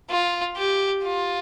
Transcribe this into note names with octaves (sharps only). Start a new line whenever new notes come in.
F4
G4
F4